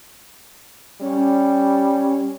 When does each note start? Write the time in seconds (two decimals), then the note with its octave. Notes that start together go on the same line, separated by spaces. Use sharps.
1.01 G3 C#4